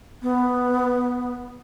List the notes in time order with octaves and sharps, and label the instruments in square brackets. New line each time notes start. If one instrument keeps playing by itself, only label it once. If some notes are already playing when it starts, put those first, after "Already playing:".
[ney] B3